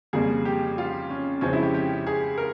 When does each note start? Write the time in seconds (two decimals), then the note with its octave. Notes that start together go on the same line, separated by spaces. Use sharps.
0.13 F2 C#3 G3 A#3 G#4
0.45 G4
0.78 F4
1.10 C#4
1.41 F2 C#3 F3 G#3 C4 C#4
1.53 E4
1.63 G4
1.74 G4
2.07 G#4
2.38 A#4